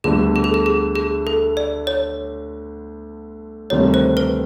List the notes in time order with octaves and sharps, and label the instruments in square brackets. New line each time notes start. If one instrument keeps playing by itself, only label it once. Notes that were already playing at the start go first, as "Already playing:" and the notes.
[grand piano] D2 D3 G3 B3 [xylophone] G#4
[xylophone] G#4
A4
G#4
G#4
G#4
A4
D5
C#5
[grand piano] D2 C3 D#3 G3 [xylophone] C#5
[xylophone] C5
B4